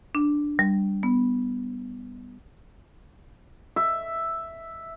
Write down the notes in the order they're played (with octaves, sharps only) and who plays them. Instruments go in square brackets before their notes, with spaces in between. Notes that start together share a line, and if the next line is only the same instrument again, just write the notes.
[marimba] D4
G3
B3
[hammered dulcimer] E5